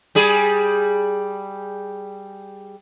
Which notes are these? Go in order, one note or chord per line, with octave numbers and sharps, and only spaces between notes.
G3 G#4